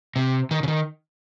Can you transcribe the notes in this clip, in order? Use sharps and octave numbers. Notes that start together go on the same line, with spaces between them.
C3
D#3
C#3
D#3